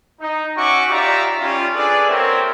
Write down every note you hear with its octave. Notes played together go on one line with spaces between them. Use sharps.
D#4
C#4 F#4 E5 G5 C#6 D6
D#4 F4 G4 D5 E5 A#5
G3 C#4 F4
D4 G#4 A4 B4 D5
A#3 C4 F#4 A#4 C#5 E5